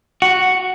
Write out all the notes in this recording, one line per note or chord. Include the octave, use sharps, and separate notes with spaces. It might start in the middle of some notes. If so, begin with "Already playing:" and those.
F#4